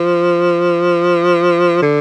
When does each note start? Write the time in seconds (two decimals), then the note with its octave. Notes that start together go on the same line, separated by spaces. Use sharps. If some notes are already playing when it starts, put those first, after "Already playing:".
Already playing: F3
1.82 D3